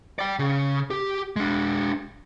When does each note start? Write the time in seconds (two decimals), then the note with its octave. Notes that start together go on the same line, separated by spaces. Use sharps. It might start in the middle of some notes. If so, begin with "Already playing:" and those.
0.19 D5 G5
0.39 C#3
0.90 G4
1.36 G#3 D4